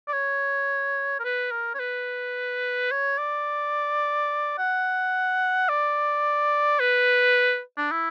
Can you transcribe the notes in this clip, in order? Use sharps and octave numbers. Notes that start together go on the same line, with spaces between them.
D5
C#5
A#4
B4
A#4
C#5
B4
C#5
D5
F#5
D5
B4
D4
E4